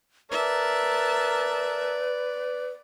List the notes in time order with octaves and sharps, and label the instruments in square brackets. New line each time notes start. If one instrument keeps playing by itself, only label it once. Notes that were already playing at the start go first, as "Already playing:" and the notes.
[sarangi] A#4 [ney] B4 [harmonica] D5 [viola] E5 A5